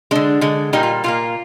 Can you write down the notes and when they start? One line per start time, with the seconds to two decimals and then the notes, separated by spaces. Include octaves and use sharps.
0.11 D3 G#3 D4
0.41 D3 G#3
0.73 A#2 G3 A#3 D#4
0.83 F4
1.04 A#2 G3 A#3 F4